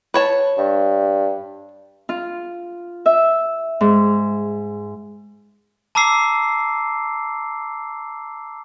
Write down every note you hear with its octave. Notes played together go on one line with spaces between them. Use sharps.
B4 C#5 A5
G2
F4
E5
G#2
A5 A#5 D6 E6 C7